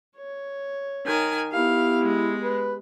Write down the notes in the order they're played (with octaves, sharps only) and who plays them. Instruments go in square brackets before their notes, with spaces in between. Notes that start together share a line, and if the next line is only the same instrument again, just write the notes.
[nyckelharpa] C#5
[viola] D#3 G#5
[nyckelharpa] B3 G4 [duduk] E4 [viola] F5
[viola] G#3
[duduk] B4